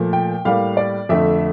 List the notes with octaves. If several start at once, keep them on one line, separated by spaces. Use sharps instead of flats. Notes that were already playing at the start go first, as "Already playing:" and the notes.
Already playing: A#2 F3 A3
G5
A2 G3 A#3 F5
D5
F2 D3 A3 E5